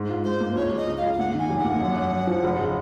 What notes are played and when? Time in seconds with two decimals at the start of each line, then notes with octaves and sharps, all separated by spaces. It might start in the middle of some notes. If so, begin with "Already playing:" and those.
Already playing: G#2
0.09 F4
0.24 G#2 C5
0.40 A#3
0.55 C#2 C#5
0.71 C#2
0.77 D#5
0.87 C#2
0.98 C#2 F5
1.13 F5
1.19 A#3 F#5
1.34 D#3
1.39 G#5
1.50 F1
1.59 F#5
1.64 A#3
1.81 F#2
1.96 F#2
2.12 F#2
2.27 F3
2.43 F1
2.59 C#3